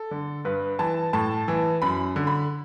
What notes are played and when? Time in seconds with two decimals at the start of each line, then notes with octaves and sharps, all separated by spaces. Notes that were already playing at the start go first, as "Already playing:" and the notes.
Already playing: A4
0.11 D3
0.45 G2 B4
0.79 E3 A5
1.13 A2 A5
1.48 E3
1.82 F#2 B5
2.16 D3
2.27 B5